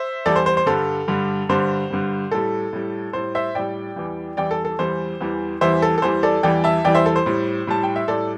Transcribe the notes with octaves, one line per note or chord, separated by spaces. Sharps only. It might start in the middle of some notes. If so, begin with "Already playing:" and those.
Already playing: C5 E5
E2 E3 G3 A4 D5
C5
C5
C5
G2 D3 G3 A4
G2 D3 G3
G2 D3 G3 C5
G2 D3 G3
A2 G3 A4
A2 G3
A2 G3 C5
C5 E5
A2 G3 D5 G5
E2 E3 G3
E2 E3 G3 D5 G5
A4
A4
E2 E3 G3 C5
E2 E3 G3
E2 E3 G3 C5 E5
A4
A4
E2 E3 G3 C5
A4 D5
E2 E3 G3 D5 G5
E5 A5
E2 E3 G3 D5 G5
C5 E5
A4
C5
A2 G3
A2 G3 A5
G5
E5
A2 G3 A4 D5